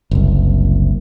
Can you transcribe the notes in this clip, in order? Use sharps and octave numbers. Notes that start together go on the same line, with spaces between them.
F#1 C2